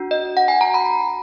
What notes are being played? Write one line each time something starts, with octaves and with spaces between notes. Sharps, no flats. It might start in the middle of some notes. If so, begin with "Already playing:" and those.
Already playing: D4 F#4
D#5
F#5
G#5
A#5
B5